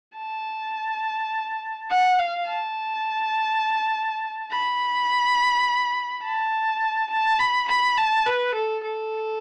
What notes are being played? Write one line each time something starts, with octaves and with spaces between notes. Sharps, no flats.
A5
F#5
F5
A5
B5
A5
A5
B5
B5
A5
B4
A4
A4